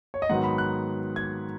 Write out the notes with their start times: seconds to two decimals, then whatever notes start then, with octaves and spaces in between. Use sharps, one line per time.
0.14 C#5
0.22 D#5
0.29 G#2 D#3 F#3 B3 F#5
0.44 B5
0.58 F#6
1.16 G#6